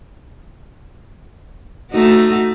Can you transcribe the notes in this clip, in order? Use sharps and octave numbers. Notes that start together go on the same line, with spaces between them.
A3 D#4 F#4